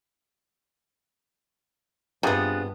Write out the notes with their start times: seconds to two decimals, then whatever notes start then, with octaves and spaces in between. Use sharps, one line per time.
2.23 G2 C3 B3 D4 F4 G#4